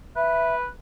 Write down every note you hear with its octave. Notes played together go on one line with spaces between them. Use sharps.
B4 E5